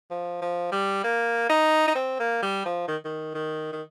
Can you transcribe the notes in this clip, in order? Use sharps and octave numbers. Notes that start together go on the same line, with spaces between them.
F3
F3
G3
A#3
D#4
D#4
C4
A#3
G3
F3
D#3
D#3
D#3
D#3